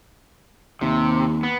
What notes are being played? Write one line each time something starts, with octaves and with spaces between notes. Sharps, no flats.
D#2 C3
B3